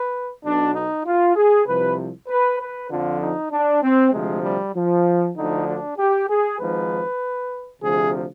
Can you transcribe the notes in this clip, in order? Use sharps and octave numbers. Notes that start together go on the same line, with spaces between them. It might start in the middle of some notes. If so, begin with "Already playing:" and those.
Already playing: B4
B1 B2 D4
D#4
F4
G#4
C2 C3 F3 B4
B4
B4
F2 D3 F3 F4
D#4
D4
C4
D2 C3 F3 G#3
G3
F3
D2 D3 F3 D#4
D4
G4
G#4
G#1 G#2 F3 B4
D2 C3 F3 G#4